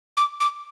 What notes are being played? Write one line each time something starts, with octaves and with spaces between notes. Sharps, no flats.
D6
D6